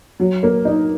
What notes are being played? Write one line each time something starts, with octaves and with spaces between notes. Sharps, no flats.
F#3
A#3
D#4